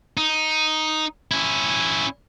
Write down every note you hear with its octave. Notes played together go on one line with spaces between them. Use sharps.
D#4
C#4 E4